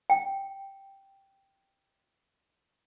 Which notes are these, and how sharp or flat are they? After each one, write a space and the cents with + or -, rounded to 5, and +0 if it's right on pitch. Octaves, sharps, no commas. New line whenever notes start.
G5 +0